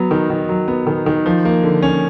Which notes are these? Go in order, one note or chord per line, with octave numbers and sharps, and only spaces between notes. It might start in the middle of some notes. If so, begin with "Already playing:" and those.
Already playing: F#3 B3
D#3
D#3
F#3
B3
D#3
D#3
F3
A#3
D3
C#4